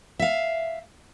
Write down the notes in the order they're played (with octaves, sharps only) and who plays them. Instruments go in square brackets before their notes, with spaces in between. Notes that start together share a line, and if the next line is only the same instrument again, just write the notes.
[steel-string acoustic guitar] E5 F5